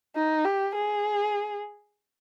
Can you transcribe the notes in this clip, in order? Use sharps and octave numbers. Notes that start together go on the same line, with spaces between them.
D#4
G4
G#4